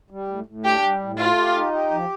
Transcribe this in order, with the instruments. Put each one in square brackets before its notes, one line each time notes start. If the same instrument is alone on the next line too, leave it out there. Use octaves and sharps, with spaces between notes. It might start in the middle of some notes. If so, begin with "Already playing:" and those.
[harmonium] G3
A2
A2
[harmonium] D4 [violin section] G4
[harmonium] G3
A2
[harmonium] A3 [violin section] F4
[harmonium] G4
D#4
G4
F3